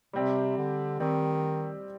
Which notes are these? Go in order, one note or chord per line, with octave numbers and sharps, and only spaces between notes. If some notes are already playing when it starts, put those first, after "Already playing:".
C3 G3 C4 G4 D5
D3
D#3 G3 C4 G4 D5